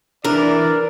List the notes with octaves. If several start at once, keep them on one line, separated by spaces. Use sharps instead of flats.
E3 D4 A#4 D5